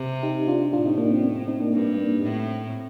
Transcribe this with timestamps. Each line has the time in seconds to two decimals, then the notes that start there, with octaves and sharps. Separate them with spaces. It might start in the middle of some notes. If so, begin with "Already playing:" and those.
Already playing: C3
0.23 D#4 G4
0.48 D4 F4
0.73 A2 D4 F4
0.86 C4 D#4
0.98 A#3 D4
1.11 C4
1.23 C4
1.36 C4
1.48 C4 D#4
1.60 A#3 D4
1.73 G2 A#3 D4
1.98 A#3 D4
2.23 A2
2.48 C4